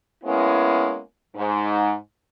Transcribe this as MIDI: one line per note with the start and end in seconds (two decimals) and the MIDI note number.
0.24 0.99 56
0.24 0.99 58
0.24 0.99 59
0.24 0.99 61
0.24 0.99 64
1.36 1.92 44